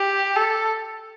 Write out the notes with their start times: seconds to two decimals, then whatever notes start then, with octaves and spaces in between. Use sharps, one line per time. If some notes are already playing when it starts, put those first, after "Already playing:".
Already playing: G4
0.36 A4